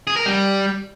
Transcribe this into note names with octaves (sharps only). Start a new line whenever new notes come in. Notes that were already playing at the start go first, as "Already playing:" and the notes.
G#4
A#4
G3